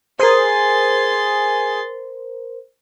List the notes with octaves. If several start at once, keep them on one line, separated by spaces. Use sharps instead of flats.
G#4 A#4 C5 C6 A6